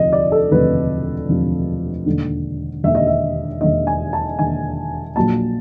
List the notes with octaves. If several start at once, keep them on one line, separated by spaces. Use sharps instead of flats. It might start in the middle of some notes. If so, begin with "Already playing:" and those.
Already playing: E1 D2 C3 F3 D#5
D5
A4
E1 D2 C3 F3 B4
E1 D2 C3 F3
E1 D#2 D3
E1 D#2 D3 E5
D#5
E5
E1 D#2 D3 D#5
G#5
A5
E1 D#2 D3 G#5
A#1 A#2 F#3 A#3 A5